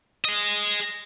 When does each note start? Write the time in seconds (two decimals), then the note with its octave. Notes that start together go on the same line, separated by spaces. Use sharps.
0.25 G#4 D#5